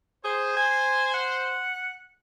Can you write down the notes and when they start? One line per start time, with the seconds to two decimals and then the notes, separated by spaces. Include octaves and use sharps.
0.25 G#4 C5
0.57 G#5
1.14 F#5